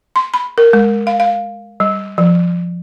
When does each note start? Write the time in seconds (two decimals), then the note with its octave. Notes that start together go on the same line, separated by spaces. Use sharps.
0.16 C6
0.34 B5
0.58 A#4
0.73 G#3
1.07 F5
1.20 F5
1.80 G3
2.18 F3